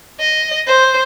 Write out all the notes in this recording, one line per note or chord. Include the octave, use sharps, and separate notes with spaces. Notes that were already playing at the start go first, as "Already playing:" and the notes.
D#5
C5